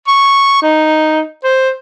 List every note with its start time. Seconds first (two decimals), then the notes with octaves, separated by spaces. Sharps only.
0.07 C#6
0.62 D#4
1.44 C5